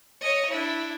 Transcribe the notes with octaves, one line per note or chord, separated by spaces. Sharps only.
C#5 D#5
D4 E4